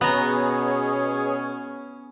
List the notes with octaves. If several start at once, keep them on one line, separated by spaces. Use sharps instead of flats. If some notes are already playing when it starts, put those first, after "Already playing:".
B2 B3 C#4 G#4 C#5 A#5